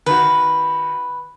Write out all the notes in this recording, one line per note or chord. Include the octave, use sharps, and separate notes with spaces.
D#3 F#4 B4